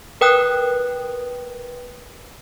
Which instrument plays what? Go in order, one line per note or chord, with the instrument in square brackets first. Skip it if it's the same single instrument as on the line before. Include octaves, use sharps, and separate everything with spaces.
[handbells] A#4 B4 G5 D#6 F#6